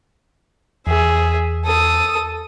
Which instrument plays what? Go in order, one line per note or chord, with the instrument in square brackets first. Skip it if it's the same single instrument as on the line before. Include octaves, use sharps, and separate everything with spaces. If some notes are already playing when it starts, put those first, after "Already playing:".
[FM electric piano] E2 [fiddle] G#4 E5
[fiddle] A4 D#6